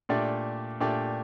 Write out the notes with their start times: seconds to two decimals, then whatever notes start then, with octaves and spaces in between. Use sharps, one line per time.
0.09 A#2 A3 D4 G4 D5
0.80 A#2 A3 D4 G4 D5